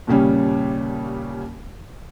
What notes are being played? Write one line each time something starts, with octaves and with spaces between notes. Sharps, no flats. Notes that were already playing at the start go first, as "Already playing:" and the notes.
D#2 A#2 C#3 G3 C#4